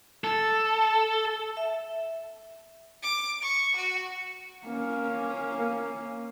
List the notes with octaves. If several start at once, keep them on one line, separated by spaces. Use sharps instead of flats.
A4
E5
D6
C#6
F#4
A#3 C#4